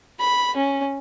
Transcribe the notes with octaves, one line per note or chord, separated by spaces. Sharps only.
B5
C#4